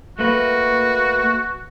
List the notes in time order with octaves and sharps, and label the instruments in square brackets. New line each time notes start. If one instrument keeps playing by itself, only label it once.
[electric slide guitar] A3 A#3 B4 [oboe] F#4